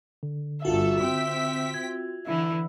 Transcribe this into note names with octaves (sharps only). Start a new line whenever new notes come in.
D3
G1 F4 F#4 A4 E5
C4 G5 B6
G#6
D3 E3 E4